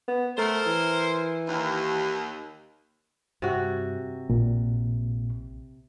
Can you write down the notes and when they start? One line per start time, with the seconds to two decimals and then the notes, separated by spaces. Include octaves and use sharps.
0.08 B3
0.38 A3 A#4 C5
0.66 E3
1.48 D#2
3.42 G2 C3 F#4
4.30 A#1 A#2